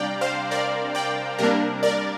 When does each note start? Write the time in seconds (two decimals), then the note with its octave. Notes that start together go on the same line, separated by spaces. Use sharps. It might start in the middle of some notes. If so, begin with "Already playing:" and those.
Already playing: C3 G3 D4 D5 F5 G5 A#5
0.21 C5 F5
0.51 A#4 D5
0.95 D5 G5
1.39 C3 G3 A#3 D4 A#4
1.83 A#4 D5